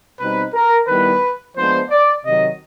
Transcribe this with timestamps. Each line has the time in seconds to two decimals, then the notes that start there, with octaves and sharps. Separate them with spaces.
0.20 B2 G3 C4 D#4 B4
0.54 A#4
0.89 D#3 G3 B3 E4 B4
1.57 F3 G#3 B3 D4 C5
1.90 D5
2.25 C3 D#3 F#3 D#5